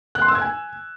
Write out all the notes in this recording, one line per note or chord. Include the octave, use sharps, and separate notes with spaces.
F#6
C6
E6
G#6
G#5